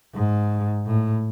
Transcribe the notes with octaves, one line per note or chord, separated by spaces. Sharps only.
G#2
A2